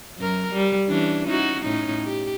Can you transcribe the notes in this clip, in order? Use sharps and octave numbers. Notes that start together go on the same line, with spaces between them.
F#2 A#4
G3
E3 C#4 D4
C#4 D#4 F#4
A2 C#4 D#4
G4